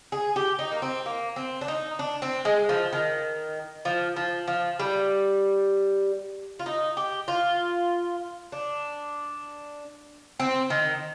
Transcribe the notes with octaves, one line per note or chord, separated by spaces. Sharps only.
G#4
G4
D#4
A#3
C4
A#3
C4
D4
D#4
D4
C4
G#3
F3
D#3
F3
F3
F3
G3
F4
D#4
G4
F4
D4
C4
D#3